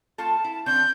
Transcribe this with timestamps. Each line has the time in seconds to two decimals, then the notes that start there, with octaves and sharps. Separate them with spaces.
0.18 A3 F4 A4 A5
0.44 E4
0.66 D3 C4 C#4 G6